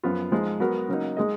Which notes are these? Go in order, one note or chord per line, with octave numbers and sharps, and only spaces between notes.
F#2 F3 B3 F4
F3 G#3 D#4
F#3 B3 F#4 A#4
C#3 F#3 A#3 D#4
G#3 D#4 G#4 D#5